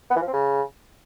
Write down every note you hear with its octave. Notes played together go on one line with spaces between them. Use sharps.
B3
E3
F3
C4
C#3